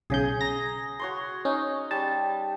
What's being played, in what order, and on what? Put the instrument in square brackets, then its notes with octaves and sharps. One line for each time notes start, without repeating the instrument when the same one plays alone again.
[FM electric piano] B1 C#3 G6 [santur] G#4 G#5
[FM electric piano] A#5 A#6
[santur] F#4 C#5 C6
[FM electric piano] C#4 [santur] D#4
[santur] G3 [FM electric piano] A5